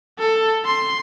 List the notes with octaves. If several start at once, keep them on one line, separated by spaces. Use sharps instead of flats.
A4
C6